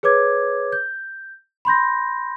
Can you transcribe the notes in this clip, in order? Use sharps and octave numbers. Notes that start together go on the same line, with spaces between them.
G#4 B4 C#5 D6 G#6
G6
B5 C6 G6 A#6